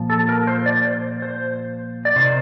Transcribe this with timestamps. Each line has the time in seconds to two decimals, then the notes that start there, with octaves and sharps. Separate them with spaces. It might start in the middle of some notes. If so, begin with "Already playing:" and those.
Already playing: A#2 F3
0.10 A4
0.29 A#4
0.47 C5
0.66 D5
0.85 C5
1.22 C5
2.05 D5
2.16 C3 D#3 C5